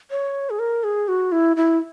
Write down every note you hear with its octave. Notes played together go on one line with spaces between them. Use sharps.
C#5
G#4
A#4
G#4
F#4
E4
E4